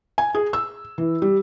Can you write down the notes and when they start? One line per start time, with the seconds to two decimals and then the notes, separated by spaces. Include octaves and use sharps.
0.18 G#5
0.34 G#4
0.53 E6
0.98 E3
1.22 G3